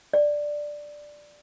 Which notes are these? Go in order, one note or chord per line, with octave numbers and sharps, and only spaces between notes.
D5